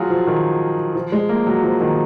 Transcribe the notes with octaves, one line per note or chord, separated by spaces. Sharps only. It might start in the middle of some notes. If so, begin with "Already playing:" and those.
Already playing: F#3 F4 G#4
F3
D#3
F3
G#3
A#3
F#3
F3
D#3